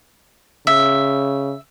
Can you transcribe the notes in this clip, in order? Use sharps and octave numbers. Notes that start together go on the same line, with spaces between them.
C#3 E5